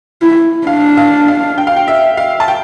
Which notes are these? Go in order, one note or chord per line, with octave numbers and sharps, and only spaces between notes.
E4
D4 F5
F5
F5
G5
F5
G5
E5
F5
A5
G5